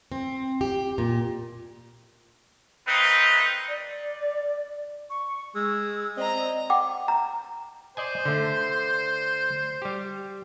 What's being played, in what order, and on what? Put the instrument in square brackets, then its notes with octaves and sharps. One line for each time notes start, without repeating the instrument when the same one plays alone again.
[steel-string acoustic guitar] C4
G4
A#2
[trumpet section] A3 A#3 C4 D#4 B4
[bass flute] D5
[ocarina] C#6
[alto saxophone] G#3 [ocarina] E6
[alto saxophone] C4 [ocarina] D5 [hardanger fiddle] D#5 A#5
[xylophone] F#5 G5 D6
A#5
[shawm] C5 [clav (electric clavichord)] D5 D#5 G#5
[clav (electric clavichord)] D3 A3 D4
G3 G4